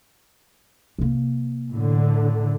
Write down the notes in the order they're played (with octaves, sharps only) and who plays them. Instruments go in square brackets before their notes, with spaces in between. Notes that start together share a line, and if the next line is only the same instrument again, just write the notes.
[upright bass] C3 A#3
[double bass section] A2 D3